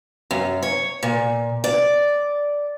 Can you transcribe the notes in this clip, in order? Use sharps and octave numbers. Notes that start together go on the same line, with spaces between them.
F#2
C#5
A#2
D5